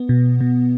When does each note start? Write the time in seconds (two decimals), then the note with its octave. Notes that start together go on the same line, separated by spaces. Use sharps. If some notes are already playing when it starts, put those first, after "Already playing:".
Already playing: B3
0.09 B2
0.41 B2